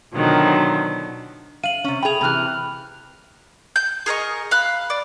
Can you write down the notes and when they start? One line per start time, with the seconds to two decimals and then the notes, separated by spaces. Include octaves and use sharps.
0.15 B2 D3 D#3 F3 F#3
1.64 F5 D#7 F#7
1.84 C3 C#4
2.03 G#4 G5 B5 F7
2.21 C3 E3 B5 F6 F#6
3.76 G6
4.06 G#4 A#4 D#5 C#6
4.51 F5 B5 F#6
4.90 D5